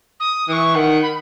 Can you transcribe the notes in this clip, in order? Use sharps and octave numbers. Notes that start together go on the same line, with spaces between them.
D#6
E3 C#6 D#6
D#3 F#5
B5